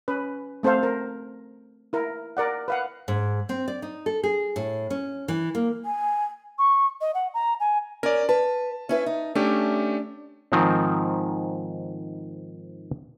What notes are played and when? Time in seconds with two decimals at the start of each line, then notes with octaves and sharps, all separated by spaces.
0.08 C#4 B4
0.63 A3 C4 A4 C5 F5
0.83 A#4
1.93 E4 A#4
2.37 A#4 D5 F#5
2.68 B4 F5 F#5
3.08 G#2
3.49 C4
3.68 D5
3.82 D#4
4.06 A4
4.23 G#4
4.56 A2
4.90 C#4
5.28 E3
5.55 A#3
5.85 G#5
6.59 C#6
7.01 D#5
7.14 F#5
7.34 A#5
7.60 G#5
8.03 C#4 A#4 D5
8.29 B4 A5
8.89 C#4 E4 B4
9.06 D#4
9.35 A3 C#4 D4 G4
10.52 G#2 D#3 F3 C4